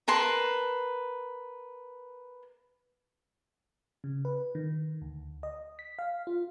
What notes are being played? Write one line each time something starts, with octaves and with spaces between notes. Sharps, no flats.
A#4 B4 A5 C6
C#3
B4
D#3
D2
D#5
B6
F5
F4